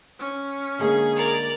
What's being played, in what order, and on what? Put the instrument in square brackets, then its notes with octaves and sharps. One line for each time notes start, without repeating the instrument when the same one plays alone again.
[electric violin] C#4
[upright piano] D3 G#3 A#3 [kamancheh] G#4
[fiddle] A#4 D5